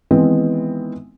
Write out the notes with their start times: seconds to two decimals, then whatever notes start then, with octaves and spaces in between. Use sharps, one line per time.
0.11 D#3 E3 G#3 B3 C4 E4